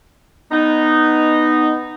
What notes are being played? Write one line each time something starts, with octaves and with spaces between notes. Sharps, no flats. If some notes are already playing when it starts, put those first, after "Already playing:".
B3 D#4